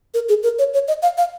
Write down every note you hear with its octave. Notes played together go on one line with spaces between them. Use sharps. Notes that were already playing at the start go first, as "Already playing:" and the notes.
A#4
G#4
A#4
C#5
C#5
D#5
F5
F5